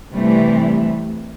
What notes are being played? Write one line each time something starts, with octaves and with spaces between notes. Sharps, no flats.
C3 E3 G3 A3